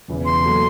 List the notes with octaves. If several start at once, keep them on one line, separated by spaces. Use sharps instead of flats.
E1 E2 C#3 E3
C6
A#2 F#3 A3